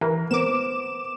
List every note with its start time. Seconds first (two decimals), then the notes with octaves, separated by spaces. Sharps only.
0.01 E3 A#4
0.31 B3 C5 D6 E7